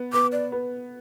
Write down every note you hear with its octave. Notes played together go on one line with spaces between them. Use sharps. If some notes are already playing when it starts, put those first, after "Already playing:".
Already playing: B3
B3 D6
D5
B3